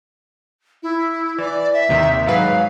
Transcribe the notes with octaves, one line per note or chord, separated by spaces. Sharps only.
E4
E3 D5
E5
D#2 C3 D#3
G#2 F#3 B4 F5